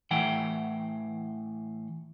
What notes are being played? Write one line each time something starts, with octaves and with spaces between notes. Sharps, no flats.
A2 E3 F#5 G5